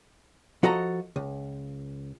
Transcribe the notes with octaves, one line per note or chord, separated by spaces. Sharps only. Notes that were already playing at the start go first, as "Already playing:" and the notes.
F3 F#4 A4 D#5 A#5
C#2